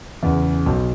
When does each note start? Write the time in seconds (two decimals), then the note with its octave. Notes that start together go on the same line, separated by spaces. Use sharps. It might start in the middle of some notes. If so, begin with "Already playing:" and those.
0.23 E2 C#3
0.66 B1